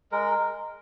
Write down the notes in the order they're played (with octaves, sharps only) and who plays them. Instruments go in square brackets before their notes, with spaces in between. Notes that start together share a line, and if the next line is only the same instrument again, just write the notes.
[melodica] G#3 A#4